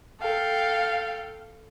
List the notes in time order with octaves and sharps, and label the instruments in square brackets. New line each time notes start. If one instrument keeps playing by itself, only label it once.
[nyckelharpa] A4 [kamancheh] F5 G5